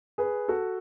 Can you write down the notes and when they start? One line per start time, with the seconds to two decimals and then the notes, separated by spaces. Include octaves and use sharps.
0.18 G#4 B4
0.48 F#4 A4